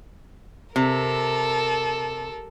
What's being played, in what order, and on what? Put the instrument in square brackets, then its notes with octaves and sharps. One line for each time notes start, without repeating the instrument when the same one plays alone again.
[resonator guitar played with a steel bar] C3 [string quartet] A4 A#4